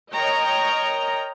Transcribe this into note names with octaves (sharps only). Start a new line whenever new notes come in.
A#4 C#5 D#5 G5 A#5